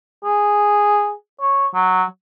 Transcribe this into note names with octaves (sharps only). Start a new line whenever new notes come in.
G#4
C#5
F#3